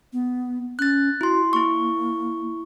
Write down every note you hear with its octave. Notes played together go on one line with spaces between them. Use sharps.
B3
C#4 F#6 A6
E4 F#4 C6
A#3 E4 C#6